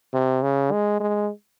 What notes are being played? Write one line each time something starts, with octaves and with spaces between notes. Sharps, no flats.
C3
C#3
G#3
G#3